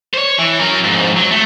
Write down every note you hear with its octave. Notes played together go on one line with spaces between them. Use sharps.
C5 C#5
E3
F#3 A#4
F2 G#2
F#3
A3